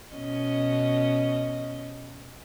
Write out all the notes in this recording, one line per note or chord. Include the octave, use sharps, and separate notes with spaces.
B2 C#4 D#5